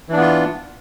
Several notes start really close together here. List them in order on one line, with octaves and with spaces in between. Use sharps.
E3 D4 B3 F4